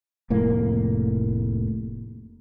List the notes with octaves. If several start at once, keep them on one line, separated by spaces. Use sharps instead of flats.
F1 A2 A#3